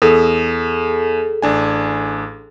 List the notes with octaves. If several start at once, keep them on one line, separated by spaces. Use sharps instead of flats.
E2 G#4 A4
A1 D4 G#5